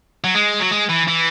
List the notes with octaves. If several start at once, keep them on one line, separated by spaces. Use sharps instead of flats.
F#3
G#3
F#3
G#3
E3
E3